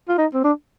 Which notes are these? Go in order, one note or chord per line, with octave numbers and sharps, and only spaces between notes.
F4
D#4
C4
D4